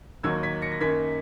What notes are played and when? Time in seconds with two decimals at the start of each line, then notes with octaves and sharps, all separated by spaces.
0.23 D#2 D#3 F#3 A#3 E6 G#6
0.43 G#6 B6
0.62 A#6 C#7
0.72 A#6
0.80 F#2 D#3 A#3 G#6 B6